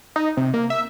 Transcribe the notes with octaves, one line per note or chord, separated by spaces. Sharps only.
D#4
C3
A#3
E5